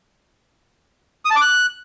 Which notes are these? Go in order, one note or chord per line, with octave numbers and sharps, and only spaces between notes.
D#6
A5
D6
F#6